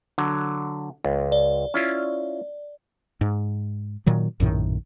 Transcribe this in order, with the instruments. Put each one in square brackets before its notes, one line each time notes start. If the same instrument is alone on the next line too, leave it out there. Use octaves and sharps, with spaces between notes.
[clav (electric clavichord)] D3 F#3
C#2
[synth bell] D5
[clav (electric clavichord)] C#4 E4 F4
[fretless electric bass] G#2
A#2 D#3 F#3
A#1 F#2 A2 D#3